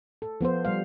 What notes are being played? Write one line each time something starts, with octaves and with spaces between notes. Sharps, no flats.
A4
F3 B3 F4 C5
G3 F5